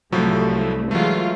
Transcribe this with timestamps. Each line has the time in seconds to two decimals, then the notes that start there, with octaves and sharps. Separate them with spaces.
0.12 C2 A2 F3 F#3 A3
0.91 E3 F#3 G#3 A3 F4